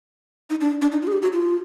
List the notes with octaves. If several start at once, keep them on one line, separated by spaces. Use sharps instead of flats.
D#4
D4
D4
D#4
F4
G#4
G4
F#4
F4